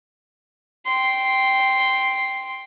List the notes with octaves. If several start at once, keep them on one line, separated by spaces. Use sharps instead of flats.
G5 C6